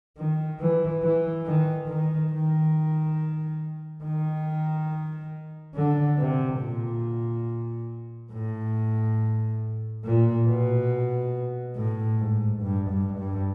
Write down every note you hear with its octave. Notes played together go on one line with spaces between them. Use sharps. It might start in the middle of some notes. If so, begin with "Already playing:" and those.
D#3
E3
E3
D#3
D#3
D#3
D#3
D3
C3
A#2
A2
A#2
B2
A2
G#2
G2
G2
G2